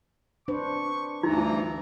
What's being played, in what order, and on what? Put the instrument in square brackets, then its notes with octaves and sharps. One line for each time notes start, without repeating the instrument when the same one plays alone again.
[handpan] D4 B4 C5 [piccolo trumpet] C#6
[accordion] D2 G2 E3 [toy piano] D#4 [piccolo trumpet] A#5